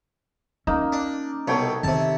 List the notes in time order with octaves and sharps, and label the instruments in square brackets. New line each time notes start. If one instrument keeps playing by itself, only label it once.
[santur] A#3 D#4 [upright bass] C#4
[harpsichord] D4
[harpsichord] C2 B2 [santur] A4 C#5 G5
[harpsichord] C3 A5 [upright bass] D#3 C4